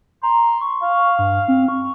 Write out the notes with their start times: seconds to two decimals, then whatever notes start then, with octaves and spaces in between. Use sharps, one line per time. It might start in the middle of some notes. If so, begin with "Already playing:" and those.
0.23 A#5 C6
0.61 C#6
0.83 F5
1.19 G2
1.48 C4
1.68 C#6